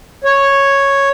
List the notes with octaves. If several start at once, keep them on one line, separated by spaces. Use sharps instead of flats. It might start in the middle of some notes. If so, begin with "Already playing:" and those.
C#5